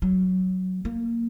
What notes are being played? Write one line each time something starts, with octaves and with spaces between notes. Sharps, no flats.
F#3
A#3